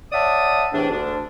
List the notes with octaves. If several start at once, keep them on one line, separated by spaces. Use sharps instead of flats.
C#5 D5 E5 F#5 A5 D#6
E2 A2 C3 E3 D4
D2 D4